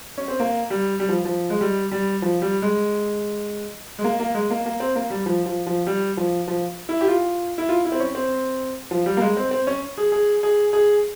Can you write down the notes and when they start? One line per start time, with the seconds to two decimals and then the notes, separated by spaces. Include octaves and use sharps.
0.18 C#4
0.28 C4
0.40 A#3
0.70 G3
1.00 G3
1.09 F3
1.25 F3
1.50 G#3
1.61 G3
1.91 G3
2.22 F3
2.42 G3
2.62 G#3
3.99 G#3
4.04 A#3
4.20 A#3
4.34 G#3
4.50 A#3
4.66 A#3
4.80 C4
4.95 A#3
5.10 G3
5.26 F3
5.46 F3
5.67 F3
5.87 G3
6.17 F3
6.48 F3
6.89 E4
7.01 G4
7.08 F4
7.58 E4
7.69 F4
7.85 E4
7.92 C4
8.00 C#4
8.15 C4
8.91 F3
9.06 G3
9.17 A#3
9.21 G#3
9.37 C4
9.51 C4
9.67 C#4
9.98 G#4
10.12 G#4
10.43 G#4
10.73 G#4